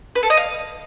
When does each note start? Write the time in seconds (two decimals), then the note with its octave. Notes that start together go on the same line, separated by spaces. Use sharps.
0.15 B4
0.23 A4
0.30 D#5
0.37 F5